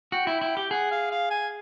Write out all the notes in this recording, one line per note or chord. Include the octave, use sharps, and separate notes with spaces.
F#4 G5
E4
E4
G4
G#4 F#5
F5
F5
G#5